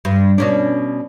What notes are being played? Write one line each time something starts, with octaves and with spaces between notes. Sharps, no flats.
G2
B2 C#4 D4